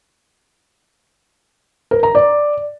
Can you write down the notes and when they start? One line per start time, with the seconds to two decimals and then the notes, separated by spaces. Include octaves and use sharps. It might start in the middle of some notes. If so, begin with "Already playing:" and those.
1.91 A#4
2.03 A#5
2.15 D5